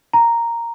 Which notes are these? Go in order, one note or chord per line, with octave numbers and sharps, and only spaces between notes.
A#5